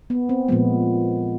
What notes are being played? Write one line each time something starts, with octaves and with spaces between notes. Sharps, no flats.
B3
C4
A#2 F3 G#3 B3